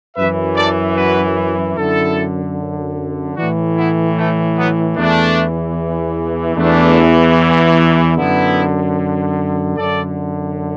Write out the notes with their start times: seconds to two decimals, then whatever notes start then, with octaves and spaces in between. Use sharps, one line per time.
0.17 F#2 E3 B4 E5
0.56 A4 D5
0.97 F#4 B4
1.76 F#2 D3 E4 A4
3.37 A2 E3 D4 F#4
3.77 B3 E4
4.17 A3
4.57 F#3 B3
4.97 E2 E3 A3 D4
6.57 E2 E3 A3 D4
8.17 F#2 D3 B3 E4
9.77 F#2 D3 A4 D5